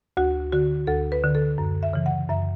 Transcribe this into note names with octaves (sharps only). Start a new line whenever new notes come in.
D2 F#4
D3 F#4
D2 A4
B4
D3
A4
F#2
E5
C#3 E3
F#5
F#2 E5